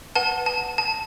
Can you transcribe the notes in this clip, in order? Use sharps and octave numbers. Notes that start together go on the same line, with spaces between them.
B4 F#5 A5
A5
A5